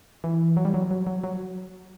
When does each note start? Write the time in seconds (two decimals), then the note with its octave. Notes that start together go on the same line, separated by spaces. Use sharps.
0.24 E3
0.57 F#3
0.65 G3
0.74 F#3
0.91 F#3
1.07 F#3
1.24 F#3